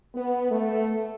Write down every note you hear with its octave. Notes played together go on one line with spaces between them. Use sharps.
B3
A3